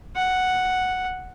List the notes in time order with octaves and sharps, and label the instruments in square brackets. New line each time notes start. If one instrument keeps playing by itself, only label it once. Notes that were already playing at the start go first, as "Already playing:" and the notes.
[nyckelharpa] F#5